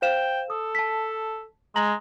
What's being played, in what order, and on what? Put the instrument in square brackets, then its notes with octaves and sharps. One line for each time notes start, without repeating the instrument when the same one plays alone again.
[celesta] C5 F5 E7 [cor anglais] G5
[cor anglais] A4 [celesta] D#6
[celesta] A5 B6
[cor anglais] G#3 [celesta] A#5 A#6 F#7